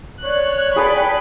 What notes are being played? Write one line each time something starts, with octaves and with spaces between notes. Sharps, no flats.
C#5 D5 F#6
G#4 B4 G5 A5 B5